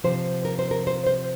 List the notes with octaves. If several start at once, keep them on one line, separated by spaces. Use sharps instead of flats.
C3 F3 C5
A#4
C5
A#4
C5
C5